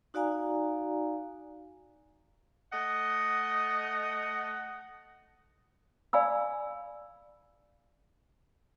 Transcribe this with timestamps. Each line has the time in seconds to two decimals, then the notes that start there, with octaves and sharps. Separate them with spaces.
0.14 D#4 F#4 D5 F5 G#5 A#5
2.73 A3 D#5 F#5
6.13 D5 F5 G#5 B5 E6